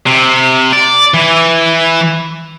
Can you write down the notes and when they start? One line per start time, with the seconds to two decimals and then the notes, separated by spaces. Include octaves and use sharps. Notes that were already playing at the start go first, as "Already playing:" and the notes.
0.06 C3
0.72 D5
1.14 E3